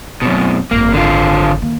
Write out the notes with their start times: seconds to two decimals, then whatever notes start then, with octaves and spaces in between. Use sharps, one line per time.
0.22 F#2 B2 C4
0.71 G#1 F#2 A#3
0.94 D3 F4
1.62 D#3 A#3